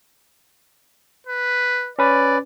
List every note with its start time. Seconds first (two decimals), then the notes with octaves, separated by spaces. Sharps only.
1.27 B4
1.99 C#4 B4 D5